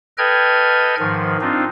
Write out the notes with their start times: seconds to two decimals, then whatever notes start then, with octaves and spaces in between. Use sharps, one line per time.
0.18 A4 B4 D#5 G5 F6 G#6
0.99 G#2 D#3 F3
1.41 C4 D4 D#4 F4